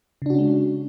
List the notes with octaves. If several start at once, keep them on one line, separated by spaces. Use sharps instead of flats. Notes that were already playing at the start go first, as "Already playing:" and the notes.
C#3 G#3 C#4 D4 F#4